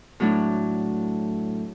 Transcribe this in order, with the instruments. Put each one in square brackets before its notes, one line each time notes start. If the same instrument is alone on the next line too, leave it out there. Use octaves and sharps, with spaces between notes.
[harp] A2 F#3 A3 D4